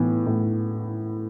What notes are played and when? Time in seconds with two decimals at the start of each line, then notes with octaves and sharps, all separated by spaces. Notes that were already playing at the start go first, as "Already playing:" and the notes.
Already playing: A2 E3 B3
0.26 A2